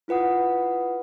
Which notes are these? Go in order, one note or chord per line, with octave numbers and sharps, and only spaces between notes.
E4 F4 B4 F#5 D#6